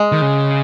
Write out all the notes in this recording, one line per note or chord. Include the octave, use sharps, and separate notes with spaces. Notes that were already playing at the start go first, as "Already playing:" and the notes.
Already playing: G#3
D#3
C#3